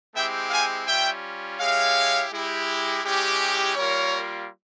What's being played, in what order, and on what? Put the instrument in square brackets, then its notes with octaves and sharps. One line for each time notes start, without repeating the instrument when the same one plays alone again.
[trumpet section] G#3 C4 E4 G4 E5 G5
F5 G#5
G3 C#4 F4 E5 G5
G#3 E4 G4 C#5 F5
G#3 E4 G4
G#3 C#4 E4 G4
G3 A#3 F4 A#4 C#5